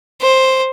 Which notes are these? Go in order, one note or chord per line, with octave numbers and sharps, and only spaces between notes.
C5